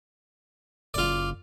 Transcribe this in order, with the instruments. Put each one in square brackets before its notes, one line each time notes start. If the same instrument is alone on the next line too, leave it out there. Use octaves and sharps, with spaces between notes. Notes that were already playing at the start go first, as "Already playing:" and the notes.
[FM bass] F#1 [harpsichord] F4 D5